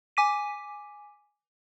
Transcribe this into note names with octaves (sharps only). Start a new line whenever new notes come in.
G#5 D6 B6 D#7